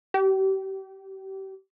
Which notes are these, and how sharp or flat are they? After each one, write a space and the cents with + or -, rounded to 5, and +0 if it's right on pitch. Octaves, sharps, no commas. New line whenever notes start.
G4 -35